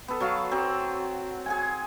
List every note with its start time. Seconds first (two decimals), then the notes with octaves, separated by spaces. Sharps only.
0.08 B3 A4
0.20 F#3 F#4 F5 A5
0.51 F#3 C4
1.46 G#4 F#5 G#5